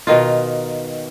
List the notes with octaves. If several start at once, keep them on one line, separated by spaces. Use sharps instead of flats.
B2 D#3 D#4 F4